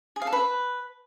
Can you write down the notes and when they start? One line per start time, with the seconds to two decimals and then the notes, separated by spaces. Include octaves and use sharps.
0.16 G#4
0.22 F5
0.27 A4
0.33 B4